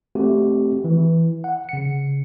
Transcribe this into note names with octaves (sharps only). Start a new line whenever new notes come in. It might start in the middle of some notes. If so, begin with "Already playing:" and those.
A3 C4 F#4 G4
E3
F#5
C#3 C#7